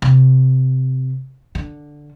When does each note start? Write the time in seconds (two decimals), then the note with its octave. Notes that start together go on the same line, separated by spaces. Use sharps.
0.02 C3
1.55 D3